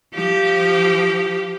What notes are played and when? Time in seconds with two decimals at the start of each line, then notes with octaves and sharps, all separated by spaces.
0.14 F3 G4